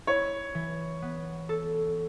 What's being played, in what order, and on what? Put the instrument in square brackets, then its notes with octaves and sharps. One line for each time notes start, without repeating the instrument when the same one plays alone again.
[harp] E4 [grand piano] C#5
[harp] E3
B3
A4